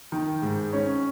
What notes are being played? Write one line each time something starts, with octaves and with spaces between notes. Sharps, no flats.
D#3
G#2
C#4